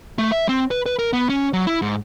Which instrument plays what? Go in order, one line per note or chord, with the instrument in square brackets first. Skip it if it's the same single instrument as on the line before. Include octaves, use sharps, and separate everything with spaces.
[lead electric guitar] A3
E5
C4
B4
B4
A#4
B3
C#4
F#3
E4
G#2